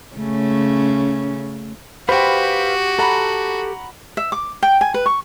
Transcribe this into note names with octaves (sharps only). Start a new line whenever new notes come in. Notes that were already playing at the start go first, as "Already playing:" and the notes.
C#3 A3 C#4
F#4 G4 B4 C5 F5 G5 B5
A4 F#5 A#5 B5
E5
D6
G5
G#5
B4
C#6